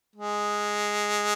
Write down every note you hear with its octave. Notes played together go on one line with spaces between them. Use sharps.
G#3